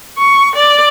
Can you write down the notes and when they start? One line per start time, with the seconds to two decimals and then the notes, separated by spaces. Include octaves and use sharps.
0.18 C#6
0.56 D5